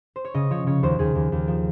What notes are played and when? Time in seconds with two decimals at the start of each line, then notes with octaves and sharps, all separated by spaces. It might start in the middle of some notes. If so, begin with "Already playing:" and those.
0.16 C5
0.25 C#5
0.34 C#3 D#5
0.50 F3 C#5
0.67 C#3 C#5
0.83 D#2 C5
0.99 D#2 G#4
1.15 D#2
1.32 D#2
1.48 F3